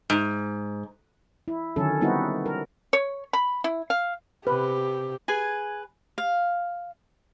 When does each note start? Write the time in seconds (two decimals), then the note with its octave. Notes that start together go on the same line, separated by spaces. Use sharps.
0.10 G#2
1.48 E4
1.76 D3 D#3 F#3 C#4 A4
2.01 G3 B3 C4 D#4 E4 F#4
2.46 A#4
2.93 C#5
3.33 B5
3.64 E4
3.90 F5
4.47 C3 G4 B4
5.28 G#4 B4 G#5
6.18 F5